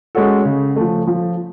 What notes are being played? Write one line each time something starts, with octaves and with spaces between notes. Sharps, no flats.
G#3 C#4 F#4 A4
C#3
F3 A3
F3